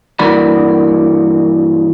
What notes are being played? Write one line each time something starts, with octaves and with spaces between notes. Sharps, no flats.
G2 E3 A#3 F#4 D5 B5